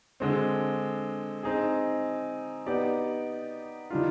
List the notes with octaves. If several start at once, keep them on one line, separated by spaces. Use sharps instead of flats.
D3 G#3 C4
C4 D#4 G#4
B3 D#4 G4 D5
D#3 G3 D4 F4